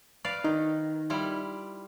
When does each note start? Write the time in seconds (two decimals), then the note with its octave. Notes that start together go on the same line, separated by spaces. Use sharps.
0.24 B4 D5 F5
0.44 D#3 D#4
1.10 G3 E4 F4